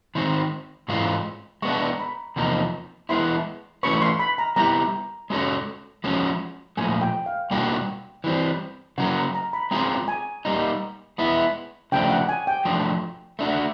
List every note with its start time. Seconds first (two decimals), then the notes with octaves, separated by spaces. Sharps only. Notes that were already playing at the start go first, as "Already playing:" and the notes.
0.15 D#3 G#3 C4 C6
0.88 G#2 E3 G#3 C4 F4
1.62 G#3 B3 D4 C#6
1.93 A#5
1.99 B5
2.36 E2 C3 F3 A#3 D#4
3.09 E3 G#3 B3 E4 C6
3.83 E3 A3 C#4 F#4 B4 C#6
4.02 C6
4.19 B5
4.38 A#5
4.56 G3 B3 E4 G4 A#5
5.30 G#3 C#4 F#4 A4 C#5
6.04 F3 G#3 C#4 F#4
6.77 A#2 F3 A3 G#5
7.01 G5
7.26 F5
7.51 B2 G3 A#3 D4 F#4 G5
8.24 E3 G3 C4
8.98 C#3 F#3 A#3 F#5
9.16 A#5
9.34 A#5
9.53 B5
9.71 G#3 C4 F4 G#4 A#5
10.08 G#5
10.45 G3 A#3 D#4
11.18 G#3 B3 E4
11.92 C#3 F3 A3 D4 G5
12.11 F#5
12.29 G#5
12.47 G5
12.65 F3 A3 D4 F#4
13.39 A3 D4 F#4